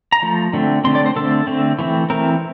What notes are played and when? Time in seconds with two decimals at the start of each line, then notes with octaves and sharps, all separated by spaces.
0.12 A#5
0.23 F3 A3
0.53 D3 A3 C4
0.84 D3 A3 C4 C6
0.95 D5
1.06 C5
1.16 D3 A3 C4 A4
1.47 D3 A3 C4
1.79 E3 A3 C4
2.10 E3 A3 C4 A#4